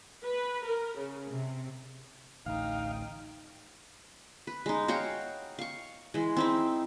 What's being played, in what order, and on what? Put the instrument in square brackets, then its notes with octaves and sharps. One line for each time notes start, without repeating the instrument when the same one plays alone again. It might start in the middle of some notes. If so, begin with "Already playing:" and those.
[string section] B4
A#4
C#3
C3
[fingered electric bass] A1 D2 [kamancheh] D#4 G5 [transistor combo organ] F5
[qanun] B4
G#3 D#4
F#4 C#5 F5 G5
F5 C#6
E3 G#3
C4 D#4 E4